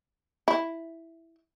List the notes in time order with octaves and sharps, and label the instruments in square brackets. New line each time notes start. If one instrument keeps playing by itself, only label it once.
[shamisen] E4